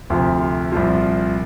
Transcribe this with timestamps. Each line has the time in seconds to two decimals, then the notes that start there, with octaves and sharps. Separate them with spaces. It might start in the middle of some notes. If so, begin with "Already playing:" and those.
0.10 D2 C3 F3
0.72 C2 A#2 F3